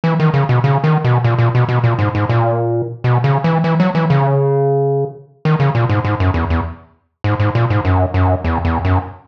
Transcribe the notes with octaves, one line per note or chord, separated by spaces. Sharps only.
E3
D#3
C#3
B2
C#3
D#3
B2
A#2
A#2
B2
B2
A#2
G#2
G#2
A#2
B2
C#3
E3
E3
F#3
E3
C#3
D#3
C#3
A#2
G#2
G#2
F#2
E2
E2
G#2
G#2
A#2
G#2
F#2
F#2
E2
E2
F#2